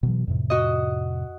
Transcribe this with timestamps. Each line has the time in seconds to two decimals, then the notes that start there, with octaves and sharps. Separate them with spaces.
0.03 B2 E3 F#3
0.27 F2 A2 C3
0.50 F#4 D#5